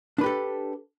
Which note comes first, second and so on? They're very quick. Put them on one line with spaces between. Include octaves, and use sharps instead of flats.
D4 B4 G4 A4